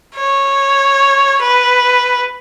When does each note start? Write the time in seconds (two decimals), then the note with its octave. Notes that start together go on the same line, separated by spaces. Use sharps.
0.15 C#5
1.42 B4